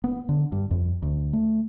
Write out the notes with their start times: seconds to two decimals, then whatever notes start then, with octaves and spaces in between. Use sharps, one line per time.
0.04 B3
0.29 D3
0.52 G2
0.71 F2
1.02 D2
1.33 A3